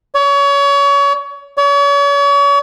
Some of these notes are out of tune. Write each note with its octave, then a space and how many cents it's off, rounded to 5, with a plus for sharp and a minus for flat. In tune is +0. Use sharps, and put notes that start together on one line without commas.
C#5 +30
C#5 +40